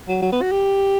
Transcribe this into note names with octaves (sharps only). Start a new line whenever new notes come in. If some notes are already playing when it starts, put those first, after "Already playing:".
F#3
F#3
B3
F#4
G4